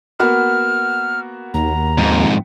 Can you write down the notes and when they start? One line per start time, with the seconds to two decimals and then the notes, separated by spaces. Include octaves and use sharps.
0.19 A#3 B3 F#4 F6
1.54 D#2 A#5
1.98 F2 G#2